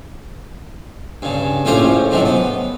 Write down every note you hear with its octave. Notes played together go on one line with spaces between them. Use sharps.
G2 C#3
A#1 A2 C#4 F4 G4 C5
G#2 C3 F3 F#3
B3